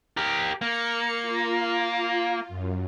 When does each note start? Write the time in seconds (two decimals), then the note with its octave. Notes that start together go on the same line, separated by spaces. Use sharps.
0.17 G4 A#4
0.62 A#3 C#7
1.22 F4
2.49 F#2